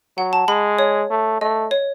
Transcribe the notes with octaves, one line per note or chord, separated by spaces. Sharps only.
F#3 F#5
A5
G#3 B5
C#5
A3
A3 D#5
C#5